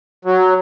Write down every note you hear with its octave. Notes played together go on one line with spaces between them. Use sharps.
F#3